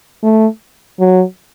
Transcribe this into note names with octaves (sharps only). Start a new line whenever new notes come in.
A3
F#3